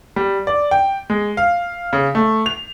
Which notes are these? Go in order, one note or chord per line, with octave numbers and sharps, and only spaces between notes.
G3
D5
G5
G#3
F5
C#3
A3
F7